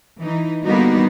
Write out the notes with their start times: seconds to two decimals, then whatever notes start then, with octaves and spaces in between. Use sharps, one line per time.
0.21 E3 D#4
0.65 D3 G3 A#3 B3 D#4 F#4